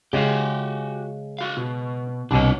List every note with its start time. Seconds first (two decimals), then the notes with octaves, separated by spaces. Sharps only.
0.13 C#3 G#3 F#4 G4
1.39 F#4 F5
1.57 B2
2.31 C2 B2 D4 C#5